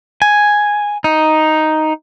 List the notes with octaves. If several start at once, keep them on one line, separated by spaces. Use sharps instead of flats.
G#5
D#4